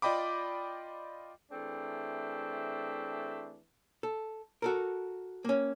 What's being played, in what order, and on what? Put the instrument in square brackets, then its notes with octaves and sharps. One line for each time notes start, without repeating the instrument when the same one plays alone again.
[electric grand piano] F4 D5 D#5 G5 B5 D6
[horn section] E3 A3 C4 D4 G#4
[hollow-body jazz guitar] A4
F#4 A4 A#4
A#3 C#4